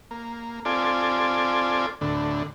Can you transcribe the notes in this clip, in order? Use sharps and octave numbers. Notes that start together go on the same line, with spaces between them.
A#3
C4 F4 A4 D5 G#5
D2 A2 D3